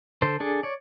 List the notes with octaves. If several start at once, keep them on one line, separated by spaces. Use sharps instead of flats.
D3 A4 C5
D4 G#4 A4
C#5 D5